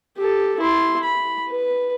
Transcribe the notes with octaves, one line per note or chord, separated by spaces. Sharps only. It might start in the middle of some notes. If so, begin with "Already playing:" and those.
G4 A4
E4 C6
B5
B4